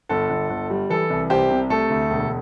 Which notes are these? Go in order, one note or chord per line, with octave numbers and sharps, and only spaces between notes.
G1 A4
G1
G1
G3
E3 A4
C2
C2 G4 C5
C3
A3 A4
D2
E1